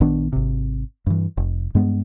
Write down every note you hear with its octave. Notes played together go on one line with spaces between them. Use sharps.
A#1 D#3 B3 D4
G#1 C3
G2 E3
F1
G2 G#3 B3